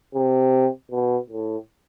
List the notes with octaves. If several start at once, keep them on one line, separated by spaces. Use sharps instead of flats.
C3
B2
A2